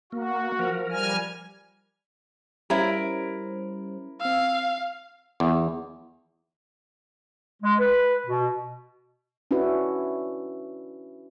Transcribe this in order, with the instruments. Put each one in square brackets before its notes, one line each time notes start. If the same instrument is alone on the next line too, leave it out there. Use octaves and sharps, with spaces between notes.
[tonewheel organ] A#3 [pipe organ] F#4
[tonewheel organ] F3 A#4
[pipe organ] G3 G#5 F6
[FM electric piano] G3 C#4 C5 [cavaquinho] E4 A#4
[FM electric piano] C4 E6 [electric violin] F5
[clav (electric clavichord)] E2
[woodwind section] G#3
B4
B2
[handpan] C#4 D4 E4 F#4 B4